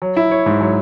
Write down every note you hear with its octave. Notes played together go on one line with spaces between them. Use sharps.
F#3
E4
C#5
G#2
F#3